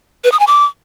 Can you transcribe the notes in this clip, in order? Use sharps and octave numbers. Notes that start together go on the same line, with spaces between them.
B4
D#6
G#5
D6